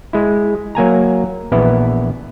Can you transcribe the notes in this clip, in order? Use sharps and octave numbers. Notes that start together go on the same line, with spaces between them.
G#3 E4
F#3 A#3 G#5 A#5
A#1 E3 B3 E4